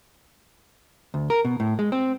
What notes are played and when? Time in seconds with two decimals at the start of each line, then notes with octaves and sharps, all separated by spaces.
1.14 D2
1.30 A#4
1.45 B2
1.60 A2
1.79 G#3
1.92 C4